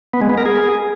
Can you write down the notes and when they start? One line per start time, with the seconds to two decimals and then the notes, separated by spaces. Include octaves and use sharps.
0.13 B3
0.22 G#3
0.30 B3
0.38 A#4
0.46 G#4